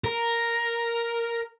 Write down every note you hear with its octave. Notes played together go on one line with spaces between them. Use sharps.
A#4